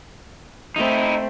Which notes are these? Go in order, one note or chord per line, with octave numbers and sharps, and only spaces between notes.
A3 C4 D#4 E4